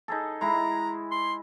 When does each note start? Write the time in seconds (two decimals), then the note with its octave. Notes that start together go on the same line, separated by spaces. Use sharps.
0.08 D#4 G#4 A4
0.41 G#3 E4 A#5
1.11 C6